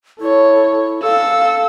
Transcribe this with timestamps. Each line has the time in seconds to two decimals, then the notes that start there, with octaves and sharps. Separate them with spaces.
0.21 E4 A4 C#5
1.03 A4 F5 E6